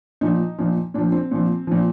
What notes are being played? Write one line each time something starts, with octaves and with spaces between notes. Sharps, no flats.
A#2 F3 D#4
A#2 F3
A#2 F3 D4
C4
A#2 F3
A#2 F3